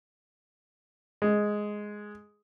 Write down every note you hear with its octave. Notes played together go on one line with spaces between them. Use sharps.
G#3